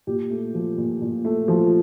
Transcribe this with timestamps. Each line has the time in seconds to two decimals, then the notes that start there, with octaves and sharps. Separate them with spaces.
0.07 A#2 G4
0.31 A3
0.54 F3
0.78 A#2
1.01 A#2
1.25 A3
1.48 F3